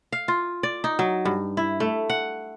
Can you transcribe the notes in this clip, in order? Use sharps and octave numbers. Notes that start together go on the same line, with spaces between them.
F5
F4
D5
D#4
F#3
G2
E4
A3
F#5